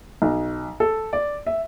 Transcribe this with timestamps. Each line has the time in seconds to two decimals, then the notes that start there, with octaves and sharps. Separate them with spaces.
0.22 B1
0.80 A4
1.13 D5
1.46 E5